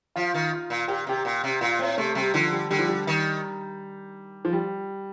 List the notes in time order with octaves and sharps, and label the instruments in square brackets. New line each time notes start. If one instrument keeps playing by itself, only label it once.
[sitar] F3 [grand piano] F4
[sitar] D#3
[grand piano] F4
[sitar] A#2
[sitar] A#2 [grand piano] G4
[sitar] C3 [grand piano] G4
[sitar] A#2
C3
[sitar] A#2 [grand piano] F4
[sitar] A2 [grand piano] C4
[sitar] C3 [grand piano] A3
[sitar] C3 [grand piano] G3
[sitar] D3 [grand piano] F3
[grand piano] G3
[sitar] D3 [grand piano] G3
[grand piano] F3
G3
[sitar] D#3
[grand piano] F3
G3